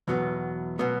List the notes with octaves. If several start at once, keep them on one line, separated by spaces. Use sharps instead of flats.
E2 B2 F#3 B3
B2 F#3 B3